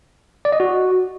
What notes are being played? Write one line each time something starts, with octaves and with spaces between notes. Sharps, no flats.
D5
D#5
F#4